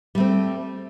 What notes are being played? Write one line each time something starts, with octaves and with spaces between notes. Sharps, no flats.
G3 A3 C4